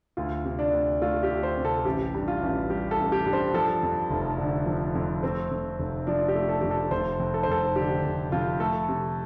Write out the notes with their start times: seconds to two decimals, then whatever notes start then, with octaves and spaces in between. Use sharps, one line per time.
0.17 D2 F4
0.45 C3
0.59 D4
0.73 D2
1.01 A3 F4
1.23 G4
1.29 D2
1.43 C5
1.57 C3
1.65 A4
1.85 A1 G4
2.14 G2
2.28 F4
2.42 A1
2.70 G3 G4
2.91 A4
2.98 A1
3.12 G4
3.26 G2
3.33 C5
3.54 F3 A4
3.83 F2
4.10 F1
4.38 D3
4.66 F3
4.95 F2
5.23 A3 C4
5.51 F2
5.79 F1
6.07 F3 D4
6.28 G4
6.35 A3
6.49 A4
6.61 F2 G4
6.71 A4
6.91 F1 C5
7.20 F2
7.34 A4
7.43 C5
7.48 F1 A4
7.76 D3 G4
8.04 F1
8.32 F2 F4
8.60 A3 A4
8.89 C3